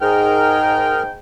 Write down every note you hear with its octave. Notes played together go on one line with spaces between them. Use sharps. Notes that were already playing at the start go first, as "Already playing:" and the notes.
G#2 G#4 A#4 G5 F6